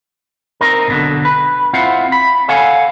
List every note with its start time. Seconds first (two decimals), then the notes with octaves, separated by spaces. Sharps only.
0.61 C4 D#4 A#4
0.88 B1 B2 D3
1.25 B4
1.73 C4 E4 F4 F#5
2.12 B5
2.48 A4 C#5 F5 F#5 G#5